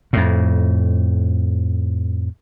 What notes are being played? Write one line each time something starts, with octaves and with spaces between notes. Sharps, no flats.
F2 A2